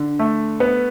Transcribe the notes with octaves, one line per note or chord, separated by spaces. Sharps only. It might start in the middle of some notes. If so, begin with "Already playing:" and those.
Already playing: D3
A3
B3